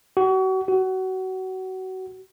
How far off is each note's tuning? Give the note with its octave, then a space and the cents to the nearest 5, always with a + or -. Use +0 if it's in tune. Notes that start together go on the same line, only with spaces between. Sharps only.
F#4 +35
F#4 +25